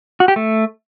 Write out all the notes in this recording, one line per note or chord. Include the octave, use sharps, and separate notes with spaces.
F#4
G4
A3